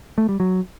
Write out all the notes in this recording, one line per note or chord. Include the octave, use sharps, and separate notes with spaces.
A3
G3
F#3